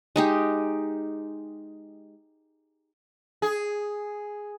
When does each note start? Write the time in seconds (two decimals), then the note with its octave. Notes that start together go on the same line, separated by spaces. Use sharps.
0.16 G#3 D#4 G4
3.42 G#4